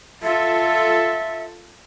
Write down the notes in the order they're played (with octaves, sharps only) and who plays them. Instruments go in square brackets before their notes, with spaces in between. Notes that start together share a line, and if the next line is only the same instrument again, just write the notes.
[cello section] F4 A4 [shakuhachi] E5